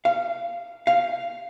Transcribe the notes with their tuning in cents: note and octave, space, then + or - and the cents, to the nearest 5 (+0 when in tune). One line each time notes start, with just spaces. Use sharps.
F5 -15
F5 -5